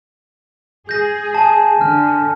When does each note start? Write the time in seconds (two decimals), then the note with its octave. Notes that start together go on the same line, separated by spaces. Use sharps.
0.89 G#4 G6 A#6
1.35 G#5 A5
1.81 D3 F6